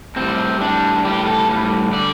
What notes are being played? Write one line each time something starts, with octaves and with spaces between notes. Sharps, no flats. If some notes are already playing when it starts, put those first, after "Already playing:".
A2 G3 C4
A2 G3 D4
A2 G3 G4
A4
A2 G3
D3 G3 D5